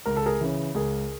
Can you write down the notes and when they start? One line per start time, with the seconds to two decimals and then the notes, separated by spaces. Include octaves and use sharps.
0.06 C#2 A#4
0.16 A4
0.26 G#4 A#4
0.41 C#3 E3
0.75 C#2 G#4 A#4